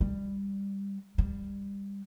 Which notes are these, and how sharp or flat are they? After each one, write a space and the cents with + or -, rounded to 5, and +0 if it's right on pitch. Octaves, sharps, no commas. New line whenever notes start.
G3 +15
G3 +20